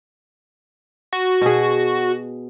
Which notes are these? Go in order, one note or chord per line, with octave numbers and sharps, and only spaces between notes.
F#4
B2 G#4